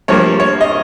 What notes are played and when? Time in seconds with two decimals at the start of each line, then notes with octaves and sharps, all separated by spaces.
0.08 G2 F3 A#3 C#5
0.40 C#5
0.61 D#5